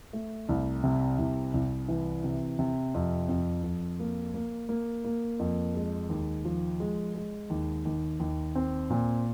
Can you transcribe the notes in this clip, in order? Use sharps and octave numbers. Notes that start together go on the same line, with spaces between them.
A3
C2
C3
C2
C2
E3
C3
C3
F2
F2
F2
A#3
A#3
A#3
A#3
F2
G#3
D#2
F3
G#3
G#3
D#2
D#2
D#2
C4
A#2